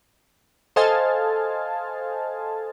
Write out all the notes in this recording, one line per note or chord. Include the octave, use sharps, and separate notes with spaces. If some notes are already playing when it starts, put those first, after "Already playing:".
A4 C5 D#5 F5 G#5 A5